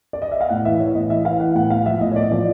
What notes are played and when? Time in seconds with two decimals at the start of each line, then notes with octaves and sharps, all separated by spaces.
0.13 D5
0.22 D#5
0.31 E5
0.41 F5
0.49 A2 F#5
0.65 E3 E5
0.80 E3 C#5
0.95 A2 D#5
1.10 E3 E5
1.25 E3 F5
1.40 E3 F#5
1.55 A2 F#5
1.70 A2 F5
1.86 F3 E5
2.01 A2 D#5
2.12 C#5
2.16 A2 D5
2.31 F3 D5